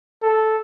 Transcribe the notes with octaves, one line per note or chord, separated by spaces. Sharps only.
A4